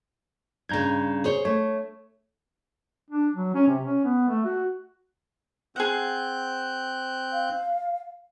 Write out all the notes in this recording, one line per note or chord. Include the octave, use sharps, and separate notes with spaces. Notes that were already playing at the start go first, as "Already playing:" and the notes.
G2 C#3 A#5 G6 G#6
G#4 C5 C#5
A3 C#5
D4
F#3
C#4
C3
C#4
B3
A3
F#4
C4 G#4 F#5 F#6 G6
F5